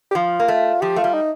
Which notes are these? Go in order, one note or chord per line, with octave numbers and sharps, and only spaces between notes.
G4
F3 F4
A#3
A3
F3 G4
A3 F4
G3
D#4